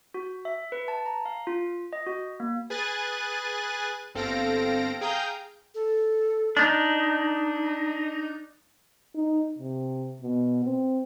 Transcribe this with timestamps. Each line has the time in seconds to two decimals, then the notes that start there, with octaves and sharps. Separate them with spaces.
0.14 F#4
0.45 E5
0.72 B4
0.88 A5
1.06 A#5
1.25 F5
1.47 F4
1.93 D#5
2.07 F#4
2.40 A#3
2.70 G#4 B4 G#5 F#6 A6 D#7
4.15 G1 C4 A4 F5 A#6 D7
5.01 G#4 F5 G5 A#5 D#6 G6
5.75 A4
6.57 D4 D#4
9.15 D#4
9.58 C3
10.22 B2
10.64 C4